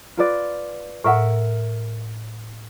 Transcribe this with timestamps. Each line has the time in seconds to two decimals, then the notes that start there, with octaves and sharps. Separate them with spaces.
0.17 F4 B4 D5
1.05 A2 A#4 E5 F#5